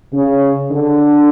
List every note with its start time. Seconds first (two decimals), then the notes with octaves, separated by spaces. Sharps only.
0.12 C#3
0.71 D3